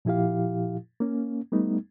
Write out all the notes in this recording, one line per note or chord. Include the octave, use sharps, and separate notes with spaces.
A#2 F3 E4 G4 F5
A#3 C#4
G3 A3 B3 D#4